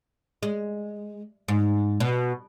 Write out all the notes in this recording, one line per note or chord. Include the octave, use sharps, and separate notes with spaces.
G#3
G#2
B2